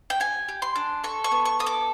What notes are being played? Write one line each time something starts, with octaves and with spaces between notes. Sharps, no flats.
G5
G4 G#5
G4
C6
D4
A4 C#6
C#6
B3
C#6
A4 D#6
D6